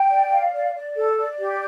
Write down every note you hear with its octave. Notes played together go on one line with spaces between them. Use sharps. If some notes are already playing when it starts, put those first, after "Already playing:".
Already playing: G5
D5
F5
D5
D5
A4
D5
G4